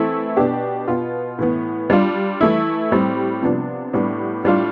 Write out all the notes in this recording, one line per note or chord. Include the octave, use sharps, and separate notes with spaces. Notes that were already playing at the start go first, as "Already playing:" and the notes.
Already playing: E3 A3 C4 E4 A4
B2 B3 D4 G4
B2 B3 F4
A2 E3 B3
G3 D4 F4
E3 A3 E4
A2 G3 C4
C3 F3 B3 D4
A2 G3 B3 D4
A2 G3 D4 F4